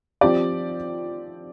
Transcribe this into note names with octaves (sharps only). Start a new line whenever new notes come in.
F3 C4 G4 D5